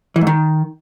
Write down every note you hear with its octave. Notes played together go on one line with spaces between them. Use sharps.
E3
G#2
D#3